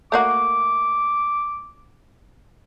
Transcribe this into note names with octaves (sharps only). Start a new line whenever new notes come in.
A3 A#3 F#4 D6